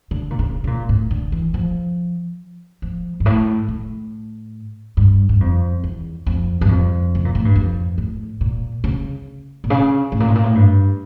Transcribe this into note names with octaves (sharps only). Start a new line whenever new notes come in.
D3
A#2
C#3
C#3
A#2
A2
D3
E3
F3
F3
G2
A2
A2
G2
G2
F2
E2
F2
G2
F2
C#3
A#2
A2
G2
F2
A2
A#2
C#3
A#2
C#3
A2
A#2
A2
A#2
A2
G2